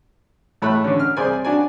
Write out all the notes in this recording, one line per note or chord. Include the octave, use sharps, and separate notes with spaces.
A2 A3 B5 F#6
D3 C#4
F6
C2 G#4 C5 D5 G#5
D4 F#4 D5 G#5